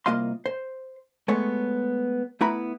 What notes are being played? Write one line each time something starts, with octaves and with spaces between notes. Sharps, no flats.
C2 A#3 F4 D#5 F5 C6
C5
G#3 A3 B3 C#5
A3 B3 E4 B4 A#5 B5